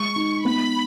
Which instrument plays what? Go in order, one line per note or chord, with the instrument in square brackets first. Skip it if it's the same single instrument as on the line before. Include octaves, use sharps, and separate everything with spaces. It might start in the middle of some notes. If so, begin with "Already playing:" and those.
Already playing: [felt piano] G#3 [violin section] C#6
[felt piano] D#4
[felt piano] B3 [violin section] B5